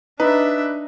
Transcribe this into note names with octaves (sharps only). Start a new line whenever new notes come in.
D4 D#4 B4 E5